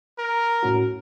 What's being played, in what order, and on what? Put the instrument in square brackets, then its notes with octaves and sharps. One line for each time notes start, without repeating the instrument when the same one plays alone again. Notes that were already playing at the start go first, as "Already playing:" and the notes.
[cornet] A#4
[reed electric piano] A2 C#4 F#4